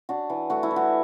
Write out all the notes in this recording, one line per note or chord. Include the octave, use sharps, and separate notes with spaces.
D4 F#4
E3
A3 F#4
E4
E3
F#4